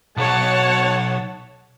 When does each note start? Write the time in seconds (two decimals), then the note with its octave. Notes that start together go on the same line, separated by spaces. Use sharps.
0.17 B1 C#5 F#5 A5